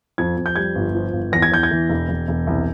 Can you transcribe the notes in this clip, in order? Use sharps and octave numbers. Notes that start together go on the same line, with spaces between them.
F2 G#6
F2
G6
G3 G#6
G1
F3
G1
E2 A#6
G#6
E2 G6
G#6
E3
E1
E1
E1
C2